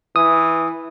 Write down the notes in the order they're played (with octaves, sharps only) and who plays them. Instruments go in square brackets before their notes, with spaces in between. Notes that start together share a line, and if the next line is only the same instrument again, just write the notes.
[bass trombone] E3 [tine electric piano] D#6